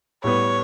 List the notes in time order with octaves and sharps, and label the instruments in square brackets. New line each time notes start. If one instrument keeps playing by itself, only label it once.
[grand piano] A2 G3 B3 [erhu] C#5